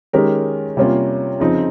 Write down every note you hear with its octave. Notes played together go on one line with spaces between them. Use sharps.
D#3 G#3 C#4 G4 A#4
C3 G3 A#3 C#4 F4
C#3 F3 C4 D#4